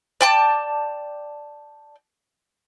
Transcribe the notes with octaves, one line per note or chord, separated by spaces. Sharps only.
D5 G5 A5